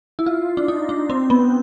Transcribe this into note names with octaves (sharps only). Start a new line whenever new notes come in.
E4
F4
D4
D#4
D4
C4
B3